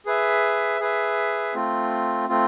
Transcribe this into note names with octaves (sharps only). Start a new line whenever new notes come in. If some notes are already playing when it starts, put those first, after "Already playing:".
G#4 B4 E5
G#4 B4 E5
A3 C4 F4
A3 C4 F4